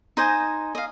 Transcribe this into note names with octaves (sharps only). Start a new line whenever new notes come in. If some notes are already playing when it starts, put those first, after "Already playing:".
D#4 C5 D#5 G#5
D#5 F5